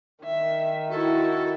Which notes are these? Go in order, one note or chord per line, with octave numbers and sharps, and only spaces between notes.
D#3 E5
E4 F#4 A4